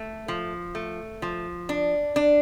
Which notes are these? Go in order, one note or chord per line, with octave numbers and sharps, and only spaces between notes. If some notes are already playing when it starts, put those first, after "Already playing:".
Already playing: A3
F3
A3
F3
D4
D4